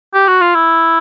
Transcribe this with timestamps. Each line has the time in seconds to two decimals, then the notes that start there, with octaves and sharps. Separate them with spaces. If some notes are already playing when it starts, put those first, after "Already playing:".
0.14 G4
0.28 F#4
0.41 F4
0.55 E4